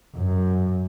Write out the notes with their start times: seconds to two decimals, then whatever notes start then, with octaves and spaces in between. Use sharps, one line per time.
0.17 F#2